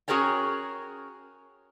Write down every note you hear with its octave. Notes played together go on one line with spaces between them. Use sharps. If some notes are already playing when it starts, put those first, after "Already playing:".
C#4 F#4 G#4 A#4 C#5 G5